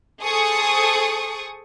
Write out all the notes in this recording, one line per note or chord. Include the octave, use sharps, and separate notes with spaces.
G#4 A4 C5 C#6 D#6